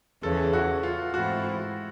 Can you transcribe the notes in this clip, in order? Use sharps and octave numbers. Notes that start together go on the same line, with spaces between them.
E2 C#3 E3 A4
F#4
F4
G#2 E3 A3 C4 E4 F#4